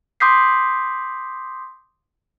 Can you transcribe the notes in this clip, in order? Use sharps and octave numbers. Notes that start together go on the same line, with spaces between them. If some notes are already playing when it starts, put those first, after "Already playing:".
C6 D6 D#6 G6 B6 C7